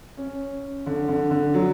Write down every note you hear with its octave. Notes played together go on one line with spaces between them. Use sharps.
C#4
D3
D3
D3
F#3